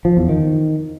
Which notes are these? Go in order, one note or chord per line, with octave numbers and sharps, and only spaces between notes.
F3
E2
D#3